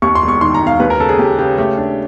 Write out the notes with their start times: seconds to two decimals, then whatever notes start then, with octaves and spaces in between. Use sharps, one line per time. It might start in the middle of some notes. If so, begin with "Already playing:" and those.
0.02 D#2 C#6
0.15 C6
0.22 E1
0.28 C#6
0.41 D#3 C6
0.55 A#5
0.61 E1
0.67 F5
0.80 D#2 B4
0.90 A#4
0.99 C#3 A4
1.09 G#4
1.19 D#2 G4
1.39 C#3 G4
1.58 A3 G4
1.77 D4